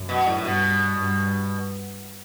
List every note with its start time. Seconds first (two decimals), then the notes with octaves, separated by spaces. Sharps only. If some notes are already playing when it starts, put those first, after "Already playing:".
Already playing: F#2
0.09 B2
0.27 A2
0.37 A2
0.44 G2 B2
0.97 G2